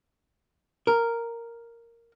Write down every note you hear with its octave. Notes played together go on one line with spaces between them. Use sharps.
A#4